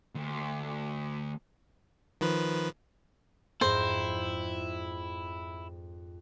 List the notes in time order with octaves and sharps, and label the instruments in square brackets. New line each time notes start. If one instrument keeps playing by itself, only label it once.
[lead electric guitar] D2
[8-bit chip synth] D#3 F3 B4
[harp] F2 G#2 A#5 [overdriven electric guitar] E4 [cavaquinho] C5